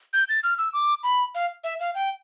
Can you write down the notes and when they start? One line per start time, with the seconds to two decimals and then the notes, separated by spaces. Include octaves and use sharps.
0.13 G6
0.29 A6
0.44 F6
0.58 E6
0.73 D6
1.03 B5
1.35 F5
1.64 E5
1.80 F5
1.95 G5